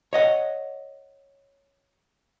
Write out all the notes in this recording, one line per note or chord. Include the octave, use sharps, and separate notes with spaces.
C#5 D#5 F#5